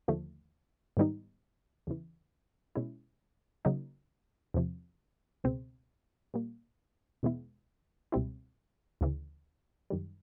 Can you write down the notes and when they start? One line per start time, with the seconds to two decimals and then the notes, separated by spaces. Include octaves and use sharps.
0.08 D#2 D3 F3 A3
0.97 G#2 D#3 G3 B3 D#4
1.87 E2 C#3 E3
2.75 B2 G#3 C#4 E4
3.65 C#3 F#3 A#3 D#4
4.54 E2 C3 F3
5.44 C#2 B2 G#3 C4
6.34 A#2 G3 A#3
7.23 E2 B2 G#3 B3 E4
8.12 C#2 B2 G3 C4 E4
9.01 D2 C#3 E3
9.90 F#2 D#3 G3